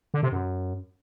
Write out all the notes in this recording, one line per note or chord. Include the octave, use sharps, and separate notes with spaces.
D3
C3
F#2